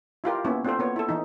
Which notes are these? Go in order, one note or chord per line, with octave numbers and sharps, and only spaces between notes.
E4 F4 G4 A#4
A#3 B3 C#4 E4
C4 D4 F4 A4 C5
A#3 B3 C#5
E4 A4
E3 D#4